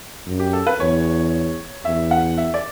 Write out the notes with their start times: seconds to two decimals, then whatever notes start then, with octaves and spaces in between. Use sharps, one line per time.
0.27 F#2
0.40 G4
0.53 A4
0.67 B4
0.80 E2 C#5
1.85 E2 E5
2.11 F#5
2.38 E5
2.54 D5